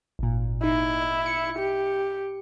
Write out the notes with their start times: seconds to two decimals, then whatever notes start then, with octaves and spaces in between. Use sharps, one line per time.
0.19 G#1 A#2
0.63 D#4 E4
1.26 C#7
1.58 G4